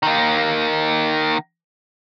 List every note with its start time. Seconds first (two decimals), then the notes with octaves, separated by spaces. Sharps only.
0.03 D#3 A#3